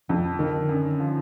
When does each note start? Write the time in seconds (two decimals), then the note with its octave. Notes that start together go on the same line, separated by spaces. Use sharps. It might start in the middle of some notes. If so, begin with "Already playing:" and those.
0.09 F2 F3
0.39 D3 D#3
0.69 F#2
1.00 F3